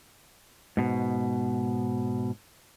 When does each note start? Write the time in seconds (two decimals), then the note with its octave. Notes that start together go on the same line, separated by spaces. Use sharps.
0.77 G#2 B2